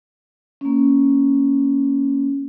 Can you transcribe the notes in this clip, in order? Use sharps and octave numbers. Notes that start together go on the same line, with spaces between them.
A#3 C#4